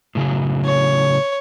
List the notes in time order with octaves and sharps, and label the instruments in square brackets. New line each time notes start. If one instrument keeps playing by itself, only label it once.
[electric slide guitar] A2 C#3 F#3
[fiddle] C#5